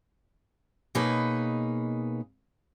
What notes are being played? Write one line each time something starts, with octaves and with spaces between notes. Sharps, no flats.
B2 A#3 D#4 G#4 B4 C#5